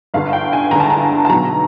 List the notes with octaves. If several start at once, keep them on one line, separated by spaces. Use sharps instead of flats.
G1 G2 D3 F5
G5
G#5
G1 G2 D3 A#5
A5
A#5
A5
B1 B2 F#3 A#5